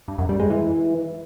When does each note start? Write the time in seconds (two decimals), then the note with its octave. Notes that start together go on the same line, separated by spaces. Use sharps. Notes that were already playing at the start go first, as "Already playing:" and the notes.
0.08 G2
0.18 F#2
0.29 G3
0.40 G#3
0.50 E3